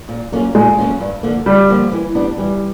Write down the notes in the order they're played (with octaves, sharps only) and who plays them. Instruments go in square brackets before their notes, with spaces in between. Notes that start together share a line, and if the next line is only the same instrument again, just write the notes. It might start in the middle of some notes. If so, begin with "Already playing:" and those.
[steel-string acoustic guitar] A#2
F#3 A#3 C#4 F4
[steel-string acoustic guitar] A#2 [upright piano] G#3
[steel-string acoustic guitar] F#3 A#3 C#4 F4
G2
D3 F3 A#3
[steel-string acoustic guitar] G2 [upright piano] G3
[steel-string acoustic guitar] D3 F3 A#3
E3
G3 B3 D4
[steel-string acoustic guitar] E3 [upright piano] G3